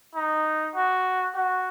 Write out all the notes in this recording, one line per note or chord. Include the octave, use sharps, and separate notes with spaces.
D#4
F#4
F#4